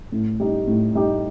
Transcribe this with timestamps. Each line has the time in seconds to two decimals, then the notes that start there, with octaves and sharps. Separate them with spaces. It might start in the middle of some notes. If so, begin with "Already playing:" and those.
0.12 A2
0.40 G3 D#4 G4
0.67 A2
0.95 G3 D#4 G4